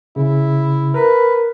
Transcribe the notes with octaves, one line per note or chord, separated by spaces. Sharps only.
C#3 E4
A#4 B4